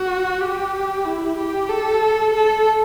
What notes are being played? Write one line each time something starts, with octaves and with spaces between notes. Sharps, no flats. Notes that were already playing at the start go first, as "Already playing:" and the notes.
Already playing: F#4
G4
E4
G4
A4
A4